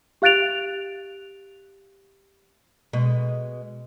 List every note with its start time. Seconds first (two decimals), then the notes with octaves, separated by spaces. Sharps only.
0.22 G4 F5 F#6 A6 D7 F7
2.93 B2 G#3